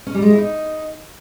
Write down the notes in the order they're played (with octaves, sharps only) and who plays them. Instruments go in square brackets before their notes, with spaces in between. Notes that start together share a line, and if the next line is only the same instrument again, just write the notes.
[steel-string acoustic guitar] C#4
G3
G#3
E4
D#4